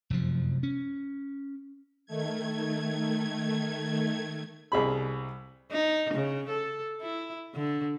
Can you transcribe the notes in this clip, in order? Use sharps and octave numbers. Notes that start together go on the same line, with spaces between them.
F1 F#2 F3
C#4
D#3 A3 G#6
C2 G#4 B5
D#4
C#3
A4
E4
D3